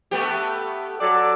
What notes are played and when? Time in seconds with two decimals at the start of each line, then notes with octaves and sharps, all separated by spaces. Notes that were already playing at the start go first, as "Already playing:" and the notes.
0.11 A3 B3 G4
1.01 F#3 A4 D5